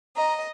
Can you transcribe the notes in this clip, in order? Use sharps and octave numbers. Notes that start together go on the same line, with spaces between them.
D#5 A#5